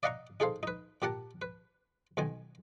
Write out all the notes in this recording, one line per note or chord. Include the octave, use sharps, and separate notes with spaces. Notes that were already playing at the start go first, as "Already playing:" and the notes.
D5 D#5 F5 F#5 A#5 C#6
D#4 G#4 A4 C5 F5
D#4 B4
A#2 G4 A#4 F#5 A5
B4
B1 B2 D#3 G#5